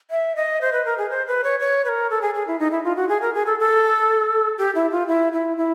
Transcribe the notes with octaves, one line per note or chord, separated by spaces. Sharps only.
E5
D#5
C5
B4
A#4
G#4
C5
B4
C#5
C#5
B4
A#4
A4
G#4
G#4
E4
D#4
E4
F4
F#4
G#4
A#4
G#4
A4
A4
G4
E4
F4
E4
E4
E4